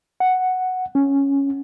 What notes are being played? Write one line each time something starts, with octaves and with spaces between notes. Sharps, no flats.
F#5
C#4